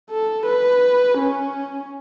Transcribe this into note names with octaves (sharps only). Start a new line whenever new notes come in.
A4
B4
C#4